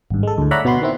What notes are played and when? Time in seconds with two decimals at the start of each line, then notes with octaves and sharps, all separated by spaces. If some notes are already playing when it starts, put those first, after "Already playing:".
0.11 G#1 G2
0.23 G#3 A4
0.38 D2 A2
0.51 C#5 D5 E5 F#5 A#5 B5
0.65 B2 B3 F#4 B5 C6
0.82 D#3 C4 E4